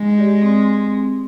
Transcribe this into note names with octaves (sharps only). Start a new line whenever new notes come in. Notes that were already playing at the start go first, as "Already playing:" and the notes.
Already playing: G#3 D#4
G4 D5
C4